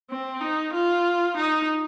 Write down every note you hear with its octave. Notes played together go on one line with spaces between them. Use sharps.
C4
D#4
F4
D#4